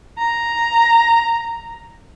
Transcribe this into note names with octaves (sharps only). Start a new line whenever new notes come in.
A#5